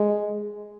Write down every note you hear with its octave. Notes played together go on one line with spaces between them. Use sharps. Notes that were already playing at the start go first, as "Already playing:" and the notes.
Already playing: G#3